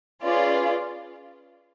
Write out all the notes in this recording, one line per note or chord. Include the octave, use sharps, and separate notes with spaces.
C#4 F4 G#4 B4 D5